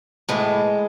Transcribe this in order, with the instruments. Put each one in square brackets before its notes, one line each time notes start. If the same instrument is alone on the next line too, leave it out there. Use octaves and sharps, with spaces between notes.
[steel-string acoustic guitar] A2 E3 G#3